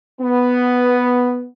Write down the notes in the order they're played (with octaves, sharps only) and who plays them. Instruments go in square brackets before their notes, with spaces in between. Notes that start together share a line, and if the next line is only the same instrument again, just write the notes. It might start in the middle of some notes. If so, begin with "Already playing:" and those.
[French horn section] B3